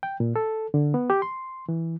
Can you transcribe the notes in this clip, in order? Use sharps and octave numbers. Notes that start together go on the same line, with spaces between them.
G5
A#2
A4
D3
B3
G4
C6
E3